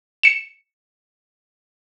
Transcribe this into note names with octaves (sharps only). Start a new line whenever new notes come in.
C#7 E7